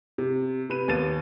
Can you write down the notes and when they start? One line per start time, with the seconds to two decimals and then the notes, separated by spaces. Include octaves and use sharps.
0.18 C3
0.69 C3 B4 D#7
0.88 D#2 B3 A6 D#7